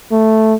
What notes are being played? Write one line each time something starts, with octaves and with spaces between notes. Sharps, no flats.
A3